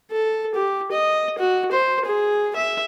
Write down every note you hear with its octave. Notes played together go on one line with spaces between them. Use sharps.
A4
G4
D#5
F#4
C5
G#4
E5